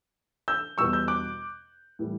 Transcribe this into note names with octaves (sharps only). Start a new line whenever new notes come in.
E6 G6
E2 B2 G3 C#6 E6
E6 G6
D6 F#6
A2 E3 G3